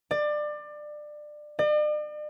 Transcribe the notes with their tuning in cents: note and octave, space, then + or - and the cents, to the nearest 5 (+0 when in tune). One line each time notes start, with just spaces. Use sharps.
D5 +25
D5 +45